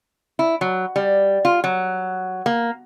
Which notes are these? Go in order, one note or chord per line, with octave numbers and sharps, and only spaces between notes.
E4
F#3
G3
F4
F#3
A#3